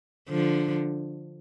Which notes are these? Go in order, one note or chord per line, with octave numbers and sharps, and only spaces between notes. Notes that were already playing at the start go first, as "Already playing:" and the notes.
D3 F3